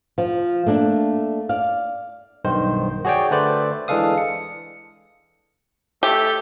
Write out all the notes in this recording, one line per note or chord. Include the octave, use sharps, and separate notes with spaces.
F3
A3 A#3 D4
D5 F5
B1 G2 D#3 C5
F#4 G#4 C#5 D5 G5
D3 A3 B4 C5 D5
E3 G#3 D4 A4 F5 D#6
C#7
A3 G4